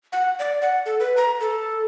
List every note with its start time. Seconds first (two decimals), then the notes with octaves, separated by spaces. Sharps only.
0.12 F#5
0.39 D5
0.62 F#5
0.86 A4
1.00 B4
1.17 A#5
1.40 A4